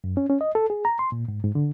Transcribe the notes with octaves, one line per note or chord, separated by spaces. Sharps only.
F#2
C#4
C#4
D#5
A4
G#4
A#5
C6
A#2
G#2
G#2
D3